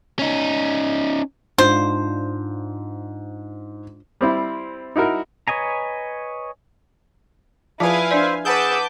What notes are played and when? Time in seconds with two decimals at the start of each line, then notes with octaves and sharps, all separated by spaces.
0.19 C#4 D#4
1.58 G#2 D4 F4 C5
4.21 G3 C4 E4
4.96 D#4 E4 F#4 A#4
5.48 B4 C#5 D#5 G#5 A#5
7.80 F3 E4 F4 G#4 B4 F5 G#5 A5
8.11 D4 C5 D5 E5
8.45 G#4 B4 F#5 A5 D6 E6 G6